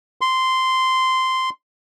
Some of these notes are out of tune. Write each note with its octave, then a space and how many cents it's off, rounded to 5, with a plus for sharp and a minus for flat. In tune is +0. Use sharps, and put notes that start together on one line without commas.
C6 -10